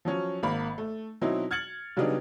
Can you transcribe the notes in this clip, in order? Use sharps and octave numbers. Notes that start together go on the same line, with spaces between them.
F3 F#3 C#4
G#1 A#3 B5
A3
B2 F#3 C4 D#4 E4
F6 G#6 A6 C#7 F#7
C#3 F#3 G3 B3 D4 D#4